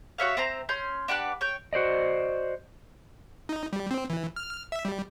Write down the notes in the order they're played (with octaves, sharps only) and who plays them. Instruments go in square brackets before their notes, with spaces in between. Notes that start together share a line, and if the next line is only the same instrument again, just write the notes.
[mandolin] F#4 C#5 E5 F5
C4 C5 A#5
C#4 C6 G6
D4 G4 B4 F#5
C#5 G5
[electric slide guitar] F#4 C5 D5 D#5
[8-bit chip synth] D#4
G3
C4
E3
F6
E5
G3